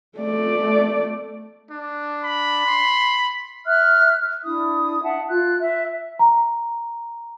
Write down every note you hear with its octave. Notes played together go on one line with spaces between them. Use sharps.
A3 D5
D4
B5
C6
E5 F6 F#6
D4 E4 D#6
E5 F#5 A5
F4 F#6
E5
A#5